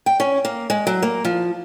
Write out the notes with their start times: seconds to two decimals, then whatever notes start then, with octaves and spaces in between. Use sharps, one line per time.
0.06 G5
0.20 C#4
0.45 A#3
0.70 G#3
0.87 F#3
1.03 A#3
1.25 F3